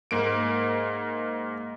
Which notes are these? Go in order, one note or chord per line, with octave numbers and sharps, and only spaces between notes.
G#2 A#3 D7